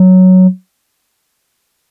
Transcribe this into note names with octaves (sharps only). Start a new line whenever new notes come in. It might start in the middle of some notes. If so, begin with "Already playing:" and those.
Already playing: F#3